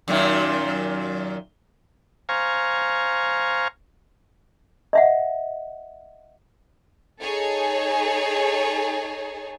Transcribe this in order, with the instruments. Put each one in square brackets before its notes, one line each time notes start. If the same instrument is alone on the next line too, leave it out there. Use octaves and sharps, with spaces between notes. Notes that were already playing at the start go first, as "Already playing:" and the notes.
[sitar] F#2 A#2 D#3
[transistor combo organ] C5 F5 G#5 A#5 C#6
[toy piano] D#5 E5 F#5
[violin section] D#4 G#4 A4 C#5